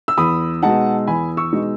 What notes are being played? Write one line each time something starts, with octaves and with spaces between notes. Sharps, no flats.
E6
E2 B5 D#6
B2 G#3 D#4 F#5 A5
E2 G#5 B5
C#6 E6
B2 G#3 D#4